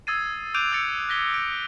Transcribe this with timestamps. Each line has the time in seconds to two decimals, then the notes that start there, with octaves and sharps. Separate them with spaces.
0.07 D#6 E6 G#6 A6 C7 D#7
0.54 D6 F#6 G6 D7 D#7 F7
0.72 E6 A6 C#7
1.09 F#6 G#6 A#6 B6 G7
1.34 D7